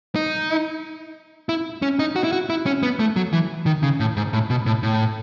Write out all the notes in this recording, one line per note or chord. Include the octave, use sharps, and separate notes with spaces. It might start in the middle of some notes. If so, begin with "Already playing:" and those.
D#4
E4
C#4
D#4
F#4
E4
F#4
E4
C#4
B3
A3
F#3
E3
D#3
C#3
A2
G#2
A2
B2
A2
A2